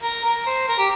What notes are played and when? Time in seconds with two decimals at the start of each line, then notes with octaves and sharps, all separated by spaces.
0.03 A#4
0.24 A#4
0.47 C5
0.68 A#4
0.79 G4